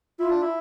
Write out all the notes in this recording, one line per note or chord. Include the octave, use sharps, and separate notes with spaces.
E4 F4
D4
E4